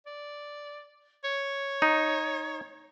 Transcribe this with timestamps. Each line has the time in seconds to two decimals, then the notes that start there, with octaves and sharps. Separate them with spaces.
0.06 D5
1.24 C#5
1.82 D#4